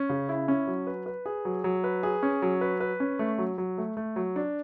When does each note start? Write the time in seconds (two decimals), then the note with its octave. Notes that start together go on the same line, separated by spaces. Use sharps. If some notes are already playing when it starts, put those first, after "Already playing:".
Already playing: C#4
0.09 C#3
0.29 E4
0.48 C#4
0.67 F#3
0.87 B4
1.06 B4
1.26 G#4
1.45 F#3
1.64 F#3
1.84 B4
2.03 G#4
2.23 C#4
2.42 F#3
2.61 B4
2.80 B4
3.00 C#4
3.19 A3
3.38 F#3
3.58 F#3
3.78 A3
3.97 A3
4.16 F#3
4.36 D4